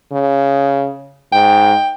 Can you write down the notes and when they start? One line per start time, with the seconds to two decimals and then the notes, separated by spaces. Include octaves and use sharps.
0.12 C#3
1.33 G#2 G5